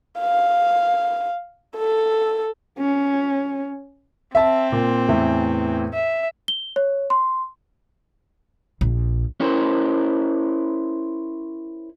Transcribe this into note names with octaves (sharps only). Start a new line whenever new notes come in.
F5
A4
C#4
C4 E5 A5
A#2
E2 A2 E3
E5
G7
C#5
C6
A#1
C#4 E4 A#4 C5